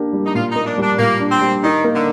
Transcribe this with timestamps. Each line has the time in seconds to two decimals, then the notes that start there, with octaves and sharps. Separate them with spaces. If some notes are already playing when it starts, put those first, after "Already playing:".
Already playing: A#3 D4 G4
0.13 G3
0.26 D#4
0.35 A#2 F4
0.51 A#3 D#4
0.66 D4
0.78 G3 D4
0.99 A#2 A#3
1.20 D4
1.31 C4
1.41 G3
1.63 D#3 D#4
1.84 A#3
1.95 D3